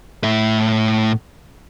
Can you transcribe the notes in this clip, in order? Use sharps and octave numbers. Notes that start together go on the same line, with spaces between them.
A2 E5